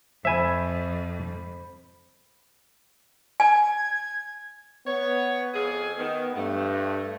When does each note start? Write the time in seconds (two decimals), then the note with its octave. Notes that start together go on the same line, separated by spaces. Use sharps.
0.25 F2 C5 E5 G#5 B5
3.40 G#5 G#6
4.86 B3 C#5
5.54 F2 G#4
5.98 D#3 B3
6.36 G2 A3